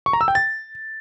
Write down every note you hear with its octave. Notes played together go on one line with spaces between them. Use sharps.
C#6
A#5
E6
G5
A6